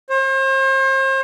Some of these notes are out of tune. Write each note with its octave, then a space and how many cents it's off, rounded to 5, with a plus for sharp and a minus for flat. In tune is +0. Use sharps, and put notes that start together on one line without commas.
C5 +40